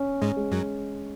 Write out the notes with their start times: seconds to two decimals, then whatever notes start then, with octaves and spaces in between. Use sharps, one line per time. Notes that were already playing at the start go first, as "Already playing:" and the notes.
Already playing: C#4
0.22 G#2 G#3
0.37 G#3
0.51 F#2 F#3